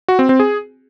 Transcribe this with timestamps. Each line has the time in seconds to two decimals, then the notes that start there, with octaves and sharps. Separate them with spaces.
0.08 F#4
0.19 C4
0.29 C4
0.40 G#4